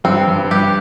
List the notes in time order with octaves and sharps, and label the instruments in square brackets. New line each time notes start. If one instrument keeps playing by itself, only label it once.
[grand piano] G2 [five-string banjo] C4
[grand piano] G2
[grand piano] G2 [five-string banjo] G4